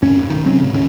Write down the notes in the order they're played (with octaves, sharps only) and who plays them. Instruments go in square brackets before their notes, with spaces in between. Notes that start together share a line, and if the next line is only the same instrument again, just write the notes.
[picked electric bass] D2 G2 C#4
F1
B1 D#3
C3 F#3 C4 C#4
G#2 C#3
D1 D#2 C#4